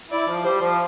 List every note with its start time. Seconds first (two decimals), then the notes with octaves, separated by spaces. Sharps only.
0.11 E4 D5
0.28 F3
0.44 G3 C5
0.61 F3